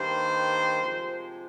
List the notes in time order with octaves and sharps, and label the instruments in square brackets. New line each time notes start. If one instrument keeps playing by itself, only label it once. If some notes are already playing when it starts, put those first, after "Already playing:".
Already playing: [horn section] G2 D#3 A#3 C5
C3 F3 G#3